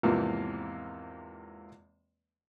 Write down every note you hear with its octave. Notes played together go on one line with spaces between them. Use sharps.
E2 G#2 C3 E3 F3 A#3